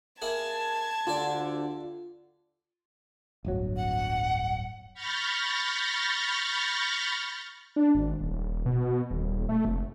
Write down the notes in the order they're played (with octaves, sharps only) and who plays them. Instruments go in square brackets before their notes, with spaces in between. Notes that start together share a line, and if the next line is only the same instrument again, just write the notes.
[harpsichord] A#3 E4 G#4 [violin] A5 G#6
[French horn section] D2 D3 [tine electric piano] F4 [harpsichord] G4 A4 D5
[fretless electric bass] D1 G1 F#3
[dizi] F#5
[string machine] B5 C#6 F6 G6 A6 A#6
[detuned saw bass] D4
G#1
D#1
B2
D#1
A3
F1